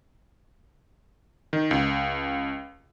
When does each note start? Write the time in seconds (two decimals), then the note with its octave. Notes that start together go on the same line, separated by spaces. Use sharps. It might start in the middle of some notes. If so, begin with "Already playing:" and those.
1.53 D#3
1.71 C#2